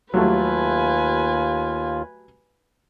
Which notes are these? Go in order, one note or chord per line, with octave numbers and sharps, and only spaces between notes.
D#2 F#3 G3 A3 F4 B4 G#5